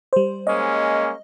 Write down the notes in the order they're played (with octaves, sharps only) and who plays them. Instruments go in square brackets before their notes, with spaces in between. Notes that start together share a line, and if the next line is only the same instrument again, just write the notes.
[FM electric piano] G3 C5
[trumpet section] G#3 A#3 C#4 [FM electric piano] D#5